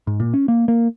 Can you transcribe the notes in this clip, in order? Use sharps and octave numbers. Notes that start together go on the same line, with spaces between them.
G#2
A#2
C#4
A#3
A#3